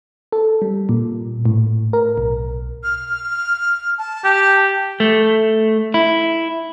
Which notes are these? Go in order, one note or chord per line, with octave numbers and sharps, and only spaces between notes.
A4
G3
A#2
A2
A#4
B1
F6
A5
G4
A3
E4